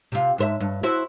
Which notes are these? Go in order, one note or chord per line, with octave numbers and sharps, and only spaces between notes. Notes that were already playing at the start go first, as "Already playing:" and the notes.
C3 F4
G#2 C5 E5
G2
E4 F#4 C5